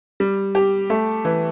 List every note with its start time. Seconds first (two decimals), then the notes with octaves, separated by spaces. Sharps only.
0.20 G3
0.55 G4
0.90 A3
1.25 E3